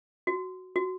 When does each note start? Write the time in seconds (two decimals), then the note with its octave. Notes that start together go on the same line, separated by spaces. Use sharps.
0.27 F#4
0.76 F#4